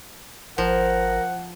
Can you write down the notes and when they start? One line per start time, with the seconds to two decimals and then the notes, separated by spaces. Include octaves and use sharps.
0.58 G#1 F3 A#4 F#5